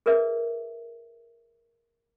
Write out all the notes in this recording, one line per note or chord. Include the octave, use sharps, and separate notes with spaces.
G#4 A#4 B4 D5 E5